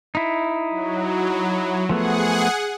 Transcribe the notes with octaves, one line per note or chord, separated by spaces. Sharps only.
D#4 E4
F#3
F3 A3 B3 G#4 F#5